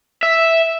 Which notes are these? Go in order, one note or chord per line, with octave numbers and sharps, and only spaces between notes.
E5